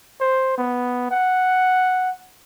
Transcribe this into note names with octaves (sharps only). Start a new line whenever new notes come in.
C5
B3
F#5